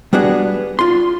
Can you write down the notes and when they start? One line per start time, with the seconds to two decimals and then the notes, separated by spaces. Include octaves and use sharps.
0.13 G3 B3 D4 F#4 G#4
0.79 F4 C6